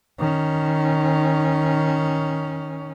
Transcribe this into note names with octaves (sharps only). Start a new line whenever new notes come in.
D#3 C#4